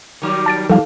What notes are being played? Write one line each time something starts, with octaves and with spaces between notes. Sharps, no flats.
D#3 F#3 G3
A5 A6 D7
D#2 F3 G3 A4 F5